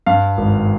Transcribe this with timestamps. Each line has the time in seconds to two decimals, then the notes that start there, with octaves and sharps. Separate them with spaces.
0.06 G2 F5
0.37 G#1